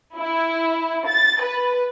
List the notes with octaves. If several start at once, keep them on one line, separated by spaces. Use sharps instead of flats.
E4
A6
B4